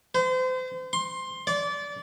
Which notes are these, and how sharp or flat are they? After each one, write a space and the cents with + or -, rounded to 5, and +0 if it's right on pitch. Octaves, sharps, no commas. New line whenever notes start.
C5 -35
C6 +15
D5 -25